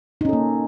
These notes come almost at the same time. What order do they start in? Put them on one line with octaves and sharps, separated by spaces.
D#4 C#4 A4 A#3